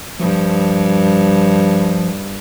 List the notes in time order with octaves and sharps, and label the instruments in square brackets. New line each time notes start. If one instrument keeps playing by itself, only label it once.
[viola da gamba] G2 [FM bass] F3